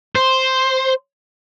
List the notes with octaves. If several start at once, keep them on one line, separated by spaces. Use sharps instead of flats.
C5